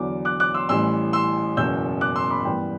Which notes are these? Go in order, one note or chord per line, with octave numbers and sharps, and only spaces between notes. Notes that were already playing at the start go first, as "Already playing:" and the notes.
Already playing: E2 D3 F#3 D6
D6 F#6
D6 F#6
C6 E6
A1 A2 E3 G3 C6 E6
C6 E6
F#1 E2 B2 E6 G6
D6 F#6
C6 E6
B5 D6
G2 E3 B3 G5 B5